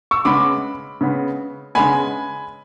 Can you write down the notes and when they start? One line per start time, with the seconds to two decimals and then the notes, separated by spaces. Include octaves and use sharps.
0.11 C#6 E6
0.25 C#3 G#3 B3 B5 D6
1.01 C#3 G#3 B3
1.75 C#3 G#3 B3 G#5 B5